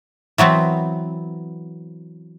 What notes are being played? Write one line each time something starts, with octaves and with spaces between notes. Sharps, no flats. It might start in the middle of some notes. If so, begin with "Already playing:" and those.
E3 F#3 B3 C4